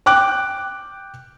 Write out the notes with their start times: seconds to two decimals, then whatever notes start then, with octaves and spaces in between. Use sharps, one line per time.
0.06 G5 D6 F#6